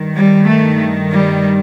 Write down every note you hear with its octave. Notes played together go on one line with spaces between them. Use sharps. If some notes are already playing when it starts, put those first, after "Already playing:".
Already playing: G2 D#3
G3
A3
G3